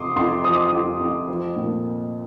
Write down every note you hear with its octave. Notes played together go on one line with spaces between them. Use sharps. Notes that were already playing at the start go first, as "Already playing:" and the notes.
Already playing: F2 C3 C6 D6 D#6
F2 C6
F3 D#6
D6
D#6
F2
F2
F3
A#2